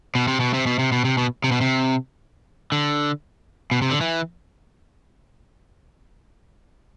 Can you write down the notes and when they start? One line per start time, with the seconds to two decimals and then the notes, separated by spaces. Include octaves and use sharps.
0.15 B2
0.28 C3
0.40 B2
0.54 C3
0.67 B2
0.79 C3
0.92 B2
1.05 C3
1.18 B2
1.44 C3
1.52 B2
1.61 C3
2.72 D3
3.71 B2
3.82 C3
3.91 D3
4.01 E3